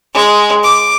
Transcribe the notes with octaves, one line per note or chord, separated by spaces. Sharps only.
G#3
D6